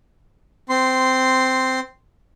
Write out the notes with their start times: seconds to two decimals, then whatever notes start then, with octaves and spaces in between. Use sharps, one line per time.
0.69 C4 C6